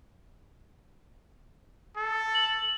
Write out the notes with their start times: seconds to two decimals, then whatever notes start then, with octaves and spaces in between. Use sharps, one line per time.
1.96 A4
2.35 F#7